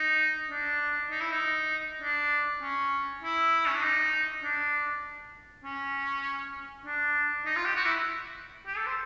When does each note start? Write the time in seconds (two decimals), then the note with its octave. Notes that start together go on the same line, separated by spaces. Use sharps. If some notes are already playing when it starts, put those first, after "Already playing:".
Already playing: D#4
0.50 D4
1.10 D#4
1.20 E4
1.30 D#4
2.01 D4
2.62 C#4
3.22 E4
3.67 C#4
3.75 D4
3.82 D#4
4.43 D4
5.63 C#4
6.85 D4
7.45 D#4
7.56 F4
7.65 G4
7.75 F#4
7.85 E4
8.66 G4
8.76 A4
8.86 C5